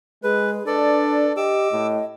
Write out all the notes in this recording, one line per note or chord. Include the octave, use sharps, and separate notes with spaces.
G#3 G#4 B4
D4 A4 B4 D5
G4 D#5 D6 E6
A2